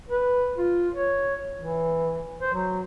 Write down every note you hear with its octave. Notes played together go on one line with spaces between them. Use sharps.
B4
F4
C#5
E3
C5
F#3